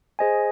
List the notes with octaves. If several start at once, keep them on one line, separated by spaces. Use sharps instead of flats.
G#4 C5 D#5 G#5